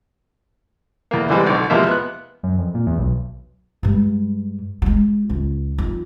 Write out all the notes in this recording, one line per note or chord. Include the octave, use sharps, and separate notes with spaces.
E2 A#3
D3 E3 G3 G#3 C4
B1 D3
E2 C3 F3 G#3 A#3 E5
B3 F#6
F#2
F2
A#2
E2
B1
G2 G#3
G3 G#3
C#2
F2 D#3